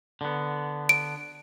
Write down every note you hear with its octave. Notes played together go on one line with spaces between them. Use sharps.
D3 B3
D7